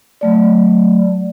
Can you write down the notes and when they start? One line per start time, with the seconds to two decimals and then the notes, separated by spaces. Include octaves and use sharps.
0.21 F#3 A3 D5